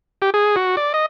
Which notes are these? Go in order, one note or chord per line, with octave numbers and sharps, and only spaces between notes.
G4
G#4
F#4
D5
D#5